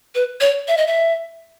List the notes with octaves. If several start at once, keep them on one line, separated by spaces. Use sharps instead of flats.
B4
C#5
E5
D#5
E5